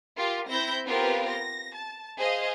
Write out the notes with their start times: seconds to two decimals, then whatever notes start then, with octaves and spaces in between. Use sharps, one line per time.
0.17 F4 G4 A#4 F5
0.49 C4 E4 G6 A#6
0.85 B3 C4 F4 G4 A#4 B4
1.29 A#6
1.75 A5
2.17 G#4 C5 D#5 F5